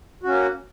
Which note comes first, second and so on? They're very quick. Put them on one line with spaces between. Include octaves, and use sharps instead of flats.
F#4 C#4 A#3